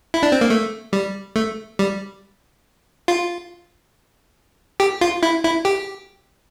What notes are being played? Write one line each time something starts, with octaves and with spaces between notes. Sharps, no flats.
E4
D4
C4
A#3
A3
G3
A3
G3
F4
G4
F4
E4
E4
G4